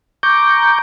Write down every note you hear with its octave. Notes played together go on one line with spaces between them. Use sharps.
A#5 C#6 D6 G6